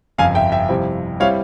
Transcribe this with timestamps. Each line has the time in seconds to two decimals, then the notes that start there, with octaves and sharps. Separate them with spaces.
0.18 G1 F2 C#3 F5 G#5
0.35 E5 G5
0.52 E5 G5
0.69 F2 C3 G3 C4 E4
1.20 G3 C4 E4 C#5 F5